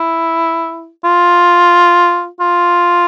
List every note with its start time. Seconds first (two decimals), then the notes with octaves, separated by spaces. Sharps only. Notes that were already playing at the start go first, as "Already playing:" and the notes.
Already playing: E4
1.05 F4
2.40 F4